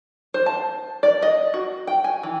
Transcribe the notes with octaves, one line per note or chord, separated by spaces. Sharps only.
C5
A5
D5
D#5
F#4
G5
G#5
E3